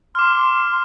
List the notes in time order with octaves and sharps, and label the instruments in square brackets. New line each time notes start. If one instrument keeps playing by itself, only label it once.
[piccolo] C6 [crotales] D6 F6